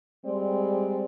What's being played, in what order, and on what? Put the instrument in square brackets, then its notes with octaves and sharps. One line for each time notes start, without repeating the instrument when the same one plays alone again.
[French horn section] G3 G#3 C4 D5